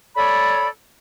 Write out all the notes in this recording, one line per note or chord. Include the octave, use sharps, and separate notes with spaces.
A4 C#5 D5 B5